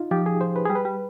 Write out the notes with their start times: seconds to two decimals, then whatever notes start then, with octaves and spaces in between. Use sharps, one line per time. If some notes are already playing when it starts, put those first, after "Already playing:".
Already playing: D#4 F4
0.11 F3 G4
0.26 G#4
0.41 C5
0.56 B4
0.66 G3 G#4
0.75 B4
0.85 G3